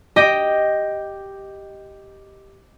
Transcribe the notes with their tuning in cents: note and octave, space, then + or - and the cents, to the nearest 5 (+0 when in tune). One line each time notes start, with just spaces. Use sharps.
G4 +0 D#5 +0